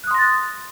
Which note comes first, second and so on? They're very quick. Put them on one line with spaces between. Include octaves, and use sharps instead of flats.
F#6 D#6 C6 A#6 A6